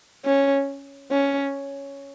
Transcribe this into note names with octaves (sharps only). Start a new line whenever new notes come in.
C#4
C#4